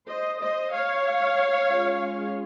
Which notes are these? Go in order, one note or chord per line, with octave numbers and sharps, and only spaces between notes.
C5 D#5
C5 D#5
C#5 F5
G#3 C#4 F4